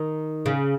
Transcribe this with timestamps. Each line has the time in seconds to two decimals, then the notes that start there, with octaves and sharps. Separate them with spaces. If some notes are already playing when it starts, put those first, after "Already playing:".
Already playing: D#3
0.46 C#3